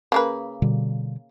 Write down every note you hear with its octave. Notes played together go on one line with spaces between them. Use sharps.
C#3 A#3 B4
B2 D3 G3